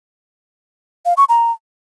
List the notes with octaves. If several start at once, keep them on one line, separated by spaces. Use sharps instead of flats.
F5
C#6
A#5